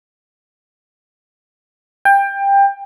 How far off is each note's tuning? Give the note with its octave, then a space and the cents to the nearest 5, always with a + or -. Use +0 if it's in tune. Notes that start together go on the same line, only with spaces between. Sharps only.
G5 +20